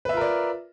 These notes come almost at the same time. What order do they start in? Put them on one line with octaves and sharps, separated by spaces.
B4 E5 F4 A#4 D5